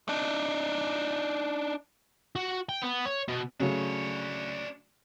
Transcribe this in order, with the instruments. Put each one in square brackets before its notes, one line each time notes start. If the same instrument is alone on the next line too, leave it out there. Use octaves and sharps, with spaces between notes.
[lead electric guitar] D4 D#4
[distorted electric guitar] F#4
G5
B3
C#5
B2
[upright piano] C#3 F#3 A3 [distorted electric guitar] D4 C#5